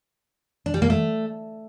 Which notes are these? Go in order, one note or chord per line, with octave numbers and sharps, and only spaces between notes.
D4
G3
A#3
A3